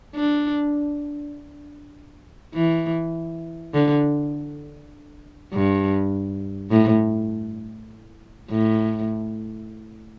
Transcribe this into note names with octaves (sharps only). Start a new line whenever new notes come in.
D4
E3
D3
G2
A2
A2